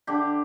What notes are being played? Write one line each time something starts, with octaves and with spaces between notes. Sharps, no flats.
D3 G4